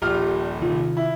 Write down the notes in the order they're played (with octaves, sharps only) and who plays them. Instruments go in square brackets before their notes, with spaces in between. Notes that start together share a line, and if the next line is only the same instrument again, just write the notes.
[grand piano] D#1 A#1 F6 [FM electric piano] G4 D5 F#5
[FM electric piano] C3 D#3 F4
[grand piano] E4